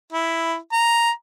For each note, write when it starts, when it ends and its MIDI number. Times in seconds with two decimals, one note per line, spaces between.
0.13 0.56 64
0.72 1.11 82